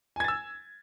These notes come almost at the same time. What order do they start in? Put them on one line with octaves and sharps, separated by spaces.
G#5 G#6 A6 E6